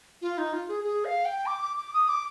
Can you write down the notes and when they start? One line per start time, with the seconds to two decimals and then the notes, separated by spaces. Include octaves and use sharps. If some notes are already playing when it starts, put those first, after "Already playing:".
0.22 F4
0.38 D#4
0.53 F4
0.68 G#4
0.84 G#4
1.05 F5
1.25 G5
1.46 D6
1.62 D6
1.77 D6
1.93 D#6
2.09 D6